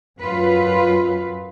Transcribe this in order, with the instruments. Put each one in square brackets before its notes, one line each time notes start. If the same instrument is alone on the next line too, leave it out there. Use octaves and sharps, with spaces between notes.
[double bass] F#2 [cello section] F4 B4